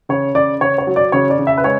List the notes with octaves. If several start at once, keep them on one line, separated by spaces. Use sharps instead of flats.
C#3 C#5
C#3 D5
C#3 C#5
C#5
F#3
D5
C#3 C#5
D5
C#3
E5
B4
G#3 C#5